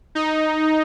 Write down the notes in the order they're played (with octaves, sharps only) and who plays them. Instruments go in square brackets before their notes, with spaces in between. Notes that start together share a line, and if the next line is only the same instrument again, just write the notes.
[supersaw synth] D#4